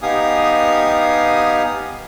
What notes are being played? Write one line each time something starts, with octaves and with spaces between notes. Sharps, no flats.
B3 D#4 G4 F5 G#5 D#6